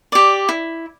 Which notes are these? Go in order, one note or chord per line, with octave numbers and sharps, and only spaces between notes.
G4 D5
E4